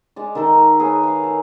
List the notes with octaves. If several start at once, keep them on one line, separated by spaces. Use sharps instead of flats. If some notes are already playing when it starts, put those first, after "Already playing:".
G#3 D5
D#3 D#4 A4 A#4
G#4 A#4 B4 C#5
F5
A4